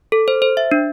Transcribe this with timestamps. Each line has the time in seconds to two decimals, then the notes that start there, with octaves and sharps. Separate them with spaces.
0.12 A4
0.28 C5
0.42 C5
0.57 E5
0.72 D4